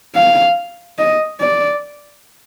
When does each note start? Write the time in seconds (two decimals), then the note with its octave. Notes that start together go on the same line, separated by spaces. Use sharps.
0.15 F5
0.98 D#5
1.40 D5